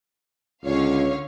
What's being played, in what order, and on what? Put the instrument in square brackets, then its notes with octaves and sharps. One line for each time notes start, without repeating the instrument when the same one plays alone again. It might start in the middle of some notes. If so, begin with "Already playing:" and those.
[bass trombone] C#2 [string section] D3 C#5 F5